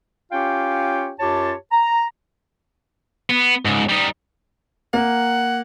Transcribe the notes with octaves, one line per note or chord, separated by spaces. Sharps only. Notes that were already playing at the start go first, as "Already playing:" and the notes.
C#4 F4 G4 C#5 F5 G5
F#2 F4 G4 C#5 A5
A#5
B3
C#2 G#2
G3 D#4
A#3 F#5